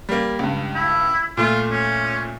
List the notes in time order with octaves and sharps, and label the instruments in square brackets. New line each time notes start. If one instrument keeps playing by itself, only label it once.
[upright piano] G3 A#3
C#2 G2
[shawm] E4
[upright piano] A#2 A3 [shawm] F4
[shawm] C#4